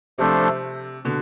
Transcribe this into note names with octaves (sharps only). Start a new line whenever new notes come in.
C3 F3 A3 D4 A4 C5
B2 D3